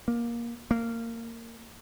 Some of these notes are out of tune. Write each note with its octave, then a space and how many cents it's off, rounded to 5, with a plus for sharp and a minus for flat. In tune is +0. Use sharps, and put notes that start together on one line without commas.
A#3 +15
A#3 -20